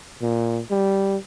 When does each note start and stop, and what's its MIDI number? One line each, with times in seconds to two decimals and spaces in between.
0.22 0.60 46
0.70 1.17 55